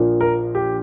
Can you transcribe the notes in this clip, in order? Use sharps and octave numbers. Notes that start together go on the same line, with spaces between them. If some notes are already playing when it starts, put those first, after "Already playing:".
Already playing: A#1 A#2 F3 A#3
A#4
G4